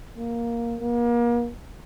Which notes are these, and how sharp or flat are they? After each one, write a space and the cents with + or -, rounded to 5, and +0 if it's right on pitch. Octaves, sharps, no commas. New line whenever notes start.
A#3 +5
A#3 +35